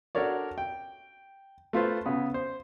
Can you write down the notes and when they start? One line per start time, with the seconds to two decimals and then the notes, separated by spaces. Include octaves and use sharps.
0.15 D4 F#4 A4 A#4 C#5 D5
0.58 G5
1.73 A3 F4 B4 C5
2.06 C#3 B3 G#4
2.34 C5